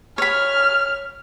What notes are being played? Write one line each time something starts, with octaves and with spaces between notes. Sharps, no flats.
C#5 B5 F6